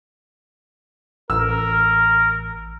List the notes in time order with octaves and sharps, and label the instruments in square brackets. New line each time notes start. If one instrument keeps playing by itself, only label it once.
[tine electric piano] A1 [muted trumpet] A#4 [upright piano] E6